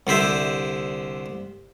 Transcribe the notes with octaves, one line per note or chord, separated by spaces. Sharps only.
C2 D3 C5 E5